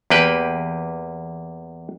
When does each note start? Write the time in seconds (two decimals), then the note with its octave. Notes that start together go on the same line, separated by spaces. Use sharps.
0.10 E2 A#3 G4 B4 G5